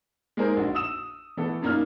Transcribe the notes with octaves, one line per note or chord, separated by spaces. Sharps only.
G#3 A#3 D#4 G#4 A#4 C5
A#1 F#4
D#6 E6 E7
E3 A3 B3 A4
F#2 C#3 A#3 D#4 F4 F6